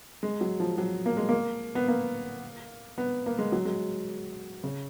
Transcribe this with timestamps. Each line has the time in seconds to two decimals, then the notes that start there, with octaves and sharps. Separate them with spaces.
0.23 G#3
0.41 F#3
0.60 F3
0.78 F#3
1.06 A#3
1.17 G#3
1.29 A#3
1.75 B3
1.88 A#3
2.98 B3
3.26 A#3
3.38 G#3
3.52 F#3
3.65 G#3
4.64 C#3